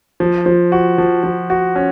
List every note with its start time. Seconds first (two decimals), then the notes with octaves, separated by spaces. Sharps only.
0.20 F3
0.46 F3
0.72 F#4
0.98 F3
1.23 F3
1.50 F#4
1.76 C#4